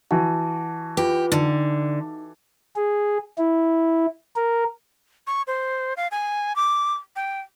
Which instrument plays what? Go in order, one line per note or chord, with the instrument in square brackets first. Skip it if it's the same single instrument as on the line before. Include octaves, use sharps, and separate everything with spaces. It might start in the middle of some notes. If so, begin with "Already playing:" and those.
[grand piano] E3 F#4 [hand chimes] A5
[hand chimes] F4 B4 [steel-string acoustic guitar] G4
[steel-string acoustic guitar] D3 [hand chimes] D#4
[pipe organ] G#4
E4
A#4
[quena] C#6
C5
F5
G#5
D6
G5